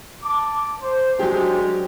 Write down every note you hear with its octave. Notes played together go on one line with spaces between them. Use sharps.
A5 D6
C5
F#3 G#3 C#4 D4 G4